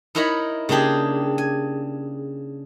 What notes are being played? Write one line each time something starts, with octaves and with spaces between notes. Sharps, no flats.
D#4 E4 A#4 C#5 A#5 B5
C#3 A#3 D4 G4 G#4
G#5